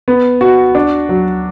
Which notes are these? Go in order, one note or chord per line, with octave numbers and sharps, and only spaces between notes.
B3
F#4
D4
F#3